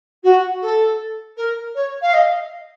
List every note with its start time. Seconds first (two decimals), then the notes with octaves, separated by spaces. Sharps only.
0.23 F#4
0.61 A4
1.36 A#4
1.75 C#5
2.01 F5
2.13 D#5